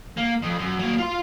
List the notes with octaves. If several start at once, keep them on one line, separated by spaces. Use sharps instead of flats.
A#3
F2
F#2
F#3 A#3
F4 C6